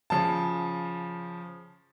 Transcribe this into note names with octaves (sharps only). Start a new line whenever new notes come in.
C#3 F3 A5